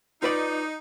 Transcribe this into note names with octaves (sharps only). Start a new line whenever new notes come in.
D#4 F4 B4 D5